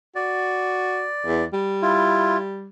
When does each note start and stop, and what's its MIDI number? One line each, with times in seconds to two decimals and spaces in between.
0.15 1.07 66
0.15 1.45 74
1.26 1.44 40
1.53 2.70 55
1.82 2.37 64
1.82 2.37 65